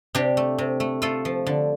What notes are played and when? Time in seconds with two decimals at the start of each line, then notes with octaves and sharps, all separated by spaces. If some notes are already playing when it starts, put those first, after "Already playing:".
0.15 C3 D4 G4
0.37 A3
0.58 C3
0.80 A3
1.02 A3 F4 A4
1.25 F3
1.46 D3